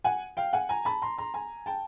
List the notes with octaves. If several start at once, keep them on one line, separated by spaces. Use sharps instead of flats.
F#5 G#5
F5 G5
F#5 G#5
G#5 A#5
A5 B5
A#5 C6
A#5 C6
G#5 A#5
G5 A5